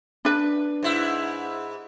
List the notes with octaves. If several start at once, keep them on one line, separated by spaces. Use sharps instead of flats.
D4 B4
G#2 E4